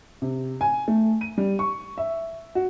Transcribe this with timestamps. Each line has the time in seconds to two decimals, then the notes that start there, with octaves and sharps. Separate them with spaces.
0.22 C3
0.61 G#5
0.88 A3
1.21 D#7
1.38 G3
1.59 C#6
1.98 E5
2.55 F#4